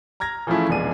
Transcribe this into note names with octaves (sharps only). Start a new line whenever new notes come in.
A#5 F6 G#6 A#6
E3 F3 A3 C#4 E4 G#4
F1 B2 G#3 D4 G#4 D#7